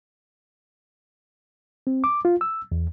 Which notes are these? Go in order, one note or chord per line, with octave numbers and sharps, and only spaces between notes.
C4
D6
F4
E6
E2